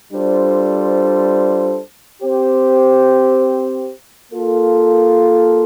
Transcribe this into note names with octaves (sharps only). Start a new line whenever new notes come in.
G3 D4 F4 A4 C5
C4 G4 C5
A#3 F4 A4